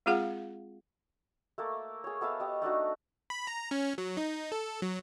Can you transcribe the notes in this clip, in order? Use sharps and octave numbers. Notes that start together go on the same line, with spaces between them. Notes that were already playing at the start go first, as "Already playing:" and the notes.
G#3 C4 F4 G#4 F5 F#5
A3 A#3 A4
G#4 C#5
B3 A4 E5 F5
G4 D#5
A3 D4 D#4 F#4
B5
A#5
C#4
F#3
D#4
A4
F#3